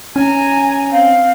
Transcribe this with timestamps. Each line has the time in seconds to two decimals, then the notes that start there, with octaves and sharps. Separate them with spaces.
0.16 C#4 G#5 A#5
0.92 C4 F5